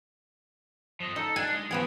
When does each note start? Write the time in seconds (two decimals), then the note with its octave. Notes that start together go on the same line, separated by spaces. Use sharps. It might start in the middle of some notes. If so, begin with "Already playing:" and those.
1.00 F3 D#5
1.16 D#4 A4
1.36 D4 G#5
1.52 G#3
1.71 E3 F3 B3 G#4